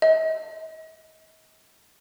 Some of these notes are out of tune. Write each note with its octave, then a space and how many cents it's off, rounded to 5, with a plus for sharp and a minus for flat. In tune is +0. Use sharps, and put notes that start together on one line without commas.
D#5 +40